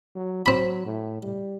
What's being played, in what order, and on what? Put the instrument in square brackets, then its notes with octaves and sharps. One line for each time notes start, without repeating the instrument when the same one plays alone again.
[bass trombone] F#3
[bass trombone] F#3 [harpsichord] C4 B5
[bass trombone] A2
G3